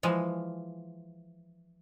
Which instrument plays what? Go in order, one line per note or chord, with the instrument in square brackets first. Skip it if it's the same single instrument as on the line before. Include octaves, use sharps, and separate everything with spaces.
[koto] E3 F3 G#3